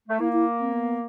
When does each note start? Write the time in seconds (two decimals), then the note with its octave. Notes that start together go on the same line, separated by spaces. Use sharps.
0.08 A3
0.19 A#3 E4
0.33 E4
0.60 C4
0.73 B3